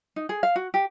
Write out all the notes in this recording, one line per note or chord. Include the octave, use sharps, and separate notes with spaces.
D#4
G#4
F5
F#4
G4